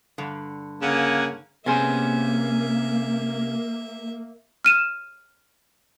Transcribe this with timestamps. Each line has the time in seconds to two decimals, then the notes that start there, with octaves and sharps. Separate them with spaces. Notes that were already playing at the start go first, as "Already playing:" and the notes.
0.18 G2 D3
0.82 C#3 A#3 F#5 G#5
1.66 C3 A#3 B3 C#4 G#4 C5 E5
4.65 F6 D#7 E7